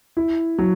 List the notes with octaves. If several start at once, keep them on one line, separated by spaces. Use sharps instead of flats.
E4
F#3